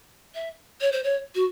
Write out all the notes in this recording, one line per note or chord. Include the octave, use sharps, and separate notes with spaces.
E5
C#5
C5
C#5
F#4